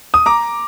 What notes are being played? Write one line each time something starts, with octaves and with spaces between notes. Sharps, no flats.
D#6
A#5 D6